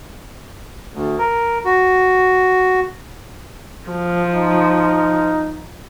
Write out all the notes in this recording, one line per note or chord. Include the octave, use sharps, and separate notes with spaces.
D2
A#4
F#4
F3
D#4